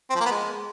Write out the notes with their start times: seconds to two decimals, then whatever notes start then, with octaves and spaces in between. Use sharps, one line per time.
0.10 C4
0.15 F3
0.20 A#3
0.26 B3
0.31 G#3